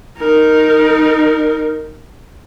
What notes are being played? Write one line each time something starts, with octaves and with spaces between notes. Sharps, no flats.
D#4 A#4